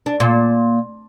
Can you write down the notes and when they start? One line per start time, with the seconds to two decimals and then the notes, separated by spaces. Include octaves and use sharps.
0.06 D4
0.20 A#2